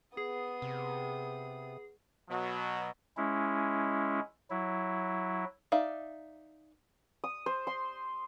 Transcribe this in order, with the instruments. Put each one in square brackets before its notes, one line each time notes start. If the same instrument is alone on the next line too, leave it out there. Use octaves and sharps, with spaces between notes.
[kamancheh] B3 D#6 [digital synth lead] G#4
[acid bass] C3
[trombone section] B2 F#3
[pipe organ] G#3 C#4 E4
F#3 E4
[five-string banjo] D#4 D5 E5 F5
[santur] D#6
C5
C6